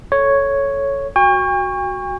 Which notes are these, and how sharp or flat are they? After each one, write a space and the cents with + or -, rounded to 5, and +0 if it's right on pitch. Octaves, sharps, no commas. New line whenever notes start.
A4 +0 C#5 +0
F#4 +0 G5 +45 C#6 +0